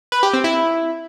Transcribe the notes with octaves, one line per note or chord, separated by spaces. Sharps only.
B4
G4
C4
E4